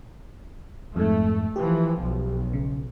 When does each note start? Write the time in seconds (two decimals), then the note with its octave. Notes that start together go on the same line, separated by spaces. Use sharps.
0.96 F2 G#2 A3
1.56 E3 F3 G4
2.01 B1
2.53 C#3